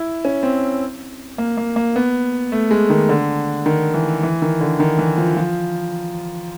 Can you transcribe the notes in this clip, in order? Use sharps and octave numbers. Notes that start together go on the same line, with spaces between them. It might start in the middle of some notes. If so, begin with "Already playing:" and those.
Already playing: E4
C#4
C4
A#3
A#3
A#3
B3
A3
G#3
D#3
D3
D#3
E3
E3
D#3
D3
D#3
E3
F3
F3